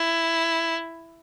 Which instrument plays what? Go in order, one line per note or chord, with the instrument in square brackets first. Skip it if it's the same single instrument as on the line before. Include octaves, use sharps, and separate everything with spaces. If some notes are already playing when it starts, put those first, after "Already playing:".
Already playing: [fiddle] E4